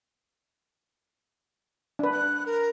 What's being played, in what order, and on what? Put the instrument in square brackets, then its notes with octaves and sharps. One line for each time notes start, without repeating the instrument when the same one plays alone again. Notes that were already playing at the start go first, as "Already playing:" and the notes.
[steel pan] D4 B4
[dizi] F#6
A#4